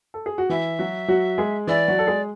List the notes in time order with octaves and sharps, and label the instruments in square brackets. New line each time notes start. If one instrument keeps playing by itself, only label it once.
[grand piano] A4
G#4
F#4
[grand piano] E3 E4 [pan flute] E5
[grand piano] F#3 F#4
F#3 F#4
G#3 G#4
[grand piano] E3 E4 [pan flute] D5
[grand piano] F#3 F#4
A4
G#3 G#4